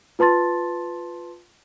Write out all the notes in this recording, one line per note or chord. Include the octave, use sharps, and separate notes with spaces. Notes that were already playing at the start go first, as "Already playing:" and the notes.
F4 B4 A5 C6 A6